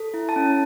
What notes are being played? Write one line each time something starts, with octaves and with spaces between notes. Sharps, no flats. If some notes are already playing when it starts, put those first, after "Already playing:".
Already playing: A4
E4
A5
C#4